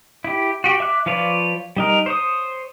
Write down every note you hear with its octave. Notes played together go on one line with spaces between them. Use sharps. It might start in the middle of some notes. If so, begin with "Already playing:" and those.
E4 G4
F#4 G4
E5 D6 F#6
F3 F4 B4 C#5 D5
G3 D#4 A#4
C5 C#5 D#6